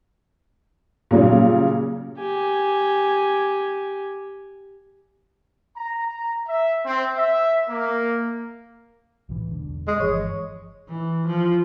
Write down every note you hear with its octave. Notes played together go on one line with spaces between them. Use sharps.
A#2 C#3 F#3 G3
G4 G#5
A#5
A#5
E5
C4
E5
A#3
B1 A2 E3
E1 D3
G#3
G1 E3 F3 C#5
E3
F3